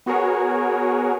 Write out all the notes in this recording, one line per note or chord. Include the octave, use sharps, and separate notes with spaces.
B3 F#4 G#4 A#4 C#5